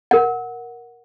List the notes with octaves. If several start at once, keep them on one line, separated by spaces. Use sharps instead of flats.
A#4 F#5